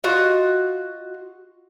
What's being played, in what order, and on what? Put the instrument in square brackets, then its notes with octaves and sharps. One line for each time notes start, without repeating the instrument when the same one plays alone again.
[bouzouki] F4 F#4 D#5